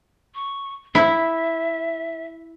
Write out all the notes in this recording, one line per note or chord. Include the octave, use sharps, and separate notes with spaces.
C#6
E4 E5